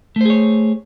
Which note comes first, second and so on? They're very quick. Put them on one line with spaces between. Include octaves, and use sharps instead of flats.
A3 C5 G#4 C#5